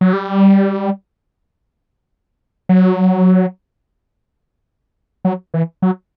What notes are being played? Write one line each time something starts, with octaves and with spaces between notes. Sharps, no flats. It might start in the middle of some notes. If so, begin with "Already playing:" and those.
F#3
G3
F#3
F#3
E3
F#3